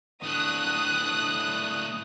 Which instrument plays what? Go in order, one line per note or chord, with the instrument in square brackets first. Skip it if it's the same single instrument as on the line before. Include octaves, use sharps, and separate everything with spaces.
[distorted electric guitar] A2 D4 [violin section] D#6 F#6